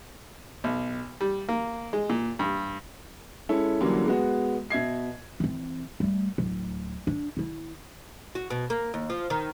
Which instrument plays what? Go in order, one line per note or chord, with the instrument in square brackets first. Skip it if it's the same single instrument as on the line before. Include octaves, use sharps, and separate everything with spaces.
[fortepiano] B1
G3
A#3
G#3
A#2
G2
[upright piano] G#3 C#4 E4 A4
F#2 D3 E3 F#3 G3 A#3
G#3 B3 F#4
B2 E5 G#6 C7
[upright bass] E3 C4
G3 A3
D1
D4
D#3 E4
[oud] F#4
B2
A#3
D#2
F3
D#3